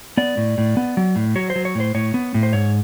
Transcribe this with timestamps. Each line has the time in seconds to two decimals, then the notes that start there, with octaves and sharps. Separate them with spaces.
0.17 B3 D5
0.37 A2
0.58 A2
0.77 B3
0.97 F#3
1.16 A2
1.36 F#3 C#5
1.50 C5
1.56 F#3
1.65 C#5
1.75 A2 C5
1.94 A2 C#5
2.14 B3
2.34 A2
2.43 C5
2.53 G#2 C#5